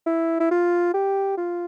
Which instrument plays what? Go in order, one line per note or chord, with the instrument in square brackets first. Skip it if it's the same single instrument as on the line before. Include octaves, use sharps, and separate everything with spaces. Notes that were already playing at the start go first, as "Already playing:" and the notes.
[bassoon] E4
E4
F4
G4
F4